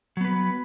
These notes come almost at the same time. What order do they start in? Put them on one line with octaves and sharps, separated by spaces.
F#3 B3 B4